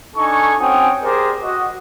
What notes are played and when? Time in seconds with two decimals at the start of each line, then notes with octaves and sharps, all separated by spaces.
0.17 D4 D#4 A4 G#5 C#6
0.60 C4 C#4 F#4 G5 G#5 D#6
1.03 G4 G#4 A#4 C5 D5
1.42 F#4 D#5